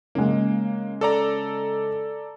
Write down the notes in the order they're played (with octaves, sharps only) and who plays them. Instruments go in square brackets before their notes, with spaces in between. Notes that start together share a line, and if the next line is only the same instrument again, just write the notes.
[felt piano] C#3 G#3 [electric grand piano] A#3
[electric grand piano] A4 D5 A#5